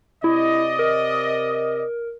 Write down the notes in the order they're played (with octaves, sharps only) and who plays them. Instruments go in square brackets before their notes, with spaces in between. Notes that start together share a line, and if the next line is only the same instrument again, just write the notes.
[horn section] C3 D5 D#5 [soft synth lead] E4
[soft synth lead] A#4